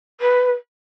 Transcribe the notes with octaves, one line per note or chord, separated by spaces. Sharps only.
B4